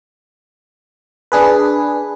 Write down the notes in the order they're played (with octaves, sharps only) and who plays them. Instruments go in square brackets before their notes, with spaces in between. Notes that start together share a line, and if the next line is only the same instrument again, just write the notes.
[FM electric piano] D4 G#4 B4